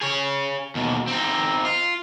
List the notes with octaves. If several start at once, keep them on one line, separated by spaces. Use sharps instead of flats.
G#4 C#5
D#2 B2
C4 D#4
F4